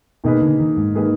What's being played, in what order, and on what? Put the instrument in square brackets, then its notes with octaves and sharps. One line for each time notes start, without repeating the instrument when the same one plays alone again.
[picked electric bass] B2 [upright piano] D#3 A#3 D#4 G#4 B4
[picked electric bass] D3
D#3
G#2
[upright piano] D#3 A#3 D#4 G#4 B4